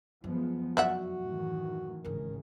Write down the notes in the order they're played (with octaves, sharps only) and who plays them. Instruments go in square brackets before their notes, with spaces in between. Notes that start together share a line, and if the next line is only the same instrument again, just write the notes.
[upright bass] F#2 [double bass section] F3 G#3 B3
[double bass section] F1 [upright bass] F#2 [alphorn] F#4 [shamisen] D5 E5 F#5
[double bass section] A2 D#3 E3
[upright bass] G#1 C#2 [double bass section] A2 C#3 [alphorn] A#4